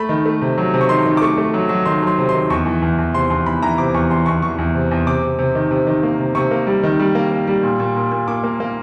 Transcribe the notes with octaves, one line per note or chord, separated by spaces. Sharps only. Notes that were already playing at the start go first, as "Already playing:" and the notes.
Already playing: A3 B5
D#3
A3
C3
F#3
C3
C#6
D#3 C6
D#3
D6
A3 C#6
A3
F#3
F#3
D#3 C6
F#3 C6
C3
D#3 C6
E2 C#6
E3
E2
E2
C3 C6
E2 C6
E2 B5
E3 A#5
C3 D6
E2 C#6
E3 C6
E2 C#6
E3 C#6
E2
C3
E2
C3 D6
C3
C3
D#3
C3
D#3
A#3
C3
C3 C#6
A#3
G3
D#3
G3
A#3
A#3
G3
A#2
A#2
A#2
A#2
A#2 D6
A#3
A#3